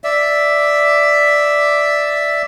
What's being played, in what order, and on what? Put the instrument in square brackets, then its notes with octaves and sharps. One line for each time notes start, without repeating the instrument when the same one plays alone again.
[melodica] D5 E5